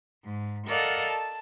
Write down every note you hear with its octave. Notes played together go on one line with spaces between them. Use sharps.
G#2
A4 A#4 D5 D#5 F5 F#5
A5